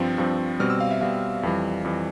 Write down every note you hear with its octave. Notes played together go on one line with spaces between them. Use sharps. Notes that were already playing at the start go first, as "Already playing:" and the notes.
Already playing: G2 F3 C4
G2 F3 C4
B2 G3 C4 F6
E6
F5
E5
B2 G3 C4 F5
F2 E3 G3
F2 E3 G3